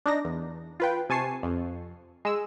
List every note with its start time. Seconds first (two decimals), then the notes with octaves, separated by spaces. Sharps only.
0.06 D4 D#4 A#6
0.25 E2
0.80 F4 B4 G5
1.10 C3 G#5 A5 C#6 C7
1.43 F2
2.25 G#3 E6